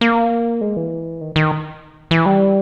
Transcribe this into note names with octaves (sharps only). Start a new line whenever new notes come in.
A#3
G#3
E3
D#3
D#3
E3
G3